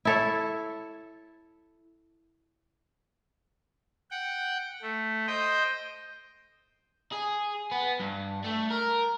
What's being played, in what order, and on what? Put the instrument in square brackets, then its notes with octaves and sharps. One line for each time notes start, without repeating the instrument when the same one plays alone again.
[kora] E4 A4 C#5
[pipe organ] F#5 G5
A3
C5 D#5 G5
[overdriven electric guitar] G#4
B3
G2
A3
A#4